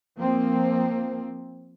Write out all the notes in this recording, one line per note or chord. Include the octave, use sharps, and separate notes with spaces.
F3 A#3 C4